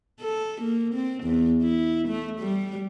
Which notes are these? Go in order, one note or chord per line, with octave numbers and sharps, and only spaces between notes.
A4
A#3
C4
E2
E4
A3
G3